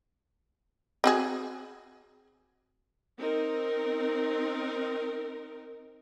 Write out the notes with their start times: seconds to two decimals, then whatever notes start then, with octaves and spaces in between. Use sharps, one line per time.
1.04 C4 F#4 G#4
3.19 C4 D#4 A#4